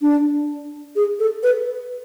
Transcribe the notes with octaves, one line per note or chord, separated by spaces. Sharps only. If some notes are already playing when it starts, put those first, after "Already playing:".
D4
G#4
A4
B4